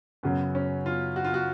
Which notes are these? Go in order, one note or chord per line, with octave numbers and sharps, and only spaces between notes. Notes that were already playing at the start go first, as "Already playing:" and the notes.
F#2 C#3 F#3 B3
C#4
F4
F#4
F4
F#4